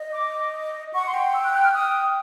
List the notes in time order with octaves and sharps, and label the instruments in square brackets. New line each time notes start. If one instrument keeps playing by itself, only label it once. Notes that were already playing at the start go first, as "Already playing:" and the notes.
Already playing: [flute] D#5
[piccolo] D6
[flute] F#5 [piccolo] C#6
[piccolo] C6
[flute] G5
[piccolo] E6
F#6
F#6
F6
D#6